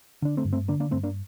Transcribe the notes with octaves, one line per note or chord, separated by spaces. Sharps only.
D3 D4
A3 C4
G2
A3 C4
D3 A#3 D4
A#3 D4
G2 A3 C4
A#3 D4